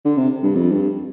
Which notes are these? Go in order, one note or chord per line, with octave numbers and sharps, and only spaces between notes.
D3
C3
G2
F2
G2